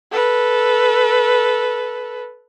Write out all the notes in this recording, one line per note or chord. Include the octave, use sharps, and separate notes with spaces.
A4 B4